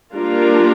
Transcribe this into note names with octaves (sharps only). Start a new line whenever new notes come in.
G3 A#3 D4 F4 A#4